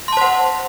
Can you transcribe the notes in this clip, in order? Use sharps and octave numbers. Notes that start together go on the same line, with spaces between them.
C5 F#5 A5 C6